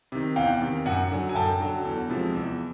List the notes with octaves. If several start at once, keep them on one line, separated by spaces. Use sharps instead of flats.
C3 D#3
E2 F5 G5
C3 D#3
F#2 F#5 G#5
D3 F#3
G#5
F#2 G5 A5
D3 F#3
E2
C3 F3 G#3
E2